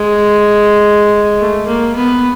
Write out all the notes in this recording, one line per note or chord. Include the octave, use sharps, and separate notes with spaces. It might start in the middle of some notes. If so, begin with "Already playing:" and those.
Already playing: G#3
A3
A#3
B3